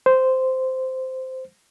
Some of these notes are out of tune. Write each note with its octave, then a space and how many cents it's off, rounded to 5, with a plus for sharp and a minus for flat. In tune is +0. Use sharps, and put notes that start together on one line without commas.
C5 -10